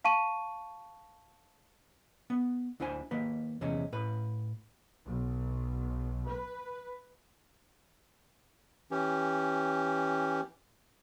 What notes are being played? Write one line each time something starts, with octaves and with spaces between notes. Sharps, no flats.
F5 A5 C#6 D#7
B3
D2 D4 E4 C5 G#5
D#3 A#3 B4
E2 C3 G#3 A3 C#4
A2 B4
B1
B4
E3 C#4 G4